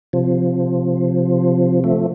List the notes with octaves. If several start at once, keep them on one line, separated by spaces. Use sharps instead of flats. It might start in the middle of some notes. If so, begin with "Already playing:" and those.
C3 F3
F3 A3